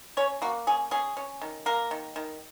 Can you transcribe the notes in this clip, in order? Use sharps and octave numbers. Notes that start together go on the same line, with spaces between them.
C#4 C#5
A#3 F#4
C#4 G#4
C#4 G#4
C#4
D#3
A#3 A#4
D#3
D#3